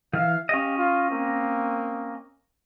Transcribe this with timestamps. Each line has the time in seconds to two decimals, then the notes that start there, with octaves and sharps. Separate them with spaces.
0.13 D#3 E3 F5
0.49 C#4 G4 D#5 F5
0.78 F4
1.11 A#3 C4